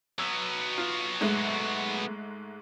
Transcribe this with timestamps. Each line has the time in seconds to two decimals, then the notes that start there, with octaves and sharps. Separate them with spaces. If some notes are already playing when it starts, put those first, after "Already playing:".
0.19 F#3 B3 E6
0.78 F4
1.21 G#2 G#3 A3